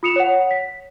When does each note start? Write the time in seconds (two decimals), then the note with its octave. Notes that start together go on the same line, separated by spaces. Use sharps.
0.03 F4 D#6 C#7 E7 F7
0.16 C#5 F#5
0.51 B6